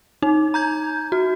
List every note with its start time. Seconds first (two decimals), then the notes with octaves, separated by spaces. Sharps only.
0.22 D#4
0.54 A#5 G6 G#6
1.12 F#4